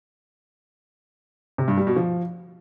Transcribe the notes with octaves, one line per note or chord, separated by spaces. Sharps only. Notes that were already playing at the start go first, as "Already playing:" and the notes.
C3
G2
G3
B2
F3